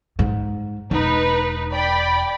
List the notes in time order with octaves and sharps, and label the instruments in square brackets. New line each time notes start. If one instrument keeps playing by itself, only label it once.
[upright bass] G#2
[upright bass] E1 [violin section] D#4 B4
[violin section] D5 G5 B5